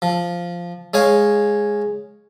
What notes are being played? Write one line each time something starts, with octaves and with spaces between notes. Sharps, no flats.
F3
G#3 C#5 F5 G#5